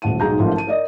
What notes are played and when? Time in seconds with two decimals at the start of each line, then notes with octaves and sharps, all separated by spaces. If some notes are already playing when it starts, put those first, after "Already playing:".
0.02 D#1 A1 F#5 A5 D#7
0.20 B1 G#2 G#4 A#5 G6
0.39 A1 G#2 F3 A3 F4 A#4
0.55 A5 D#7
0.67 A#4 D5 D#5